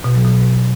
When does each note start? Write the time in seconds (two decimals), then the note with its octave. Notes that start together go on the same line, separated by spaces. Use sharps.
0.04 B2
0.15 F#3
0.25 B2